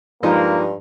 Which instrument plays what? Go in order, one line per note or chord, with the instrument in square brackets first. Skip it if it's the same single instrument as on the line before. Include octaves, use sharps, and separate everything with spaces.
[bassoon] G2 [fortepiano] F3 G#3 D#4 [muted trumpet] A#3